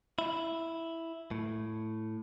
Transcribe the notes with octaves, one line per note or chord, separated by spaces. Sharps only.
E4
A2